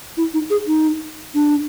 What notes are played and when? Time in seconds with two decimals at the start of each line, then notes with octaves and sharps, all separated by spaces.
0.17 E4
0.34 D#4
0.50 G#4
0.67 D#4
1.35 D4